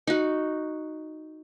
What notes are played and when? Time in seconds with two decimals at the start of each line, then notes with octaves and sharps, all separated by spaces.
0.07 D#4 F#4